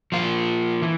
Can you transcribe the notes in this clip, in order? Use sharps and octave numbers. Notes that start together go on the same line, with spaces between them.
F3 A#3 F4
E3